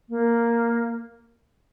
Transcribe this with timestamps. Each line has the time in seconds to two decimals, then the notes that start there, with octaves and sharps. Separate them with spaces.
0.09 A#3